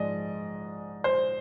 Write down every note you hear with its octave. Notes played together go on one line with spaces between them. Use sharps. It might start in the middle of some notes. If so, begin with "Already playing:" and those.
Already playing: G#2 F3 G#3 D5 D#5
C5